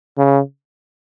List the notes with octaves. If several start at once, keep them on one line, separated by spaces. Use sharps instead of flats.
C#3